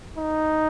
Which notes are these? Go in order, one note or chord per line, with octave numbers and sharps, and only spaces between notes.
D#4